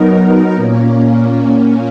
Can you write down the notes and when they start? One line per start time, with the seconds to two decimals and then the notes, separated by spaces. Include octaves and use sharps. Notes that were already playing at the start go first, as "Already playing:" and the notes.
Already playing: F#3 B3 D#4 A#4
0.55 A#2 A#3 C#4